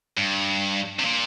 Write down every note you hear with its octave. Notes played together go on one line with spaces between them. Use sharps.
G2
C3
A#2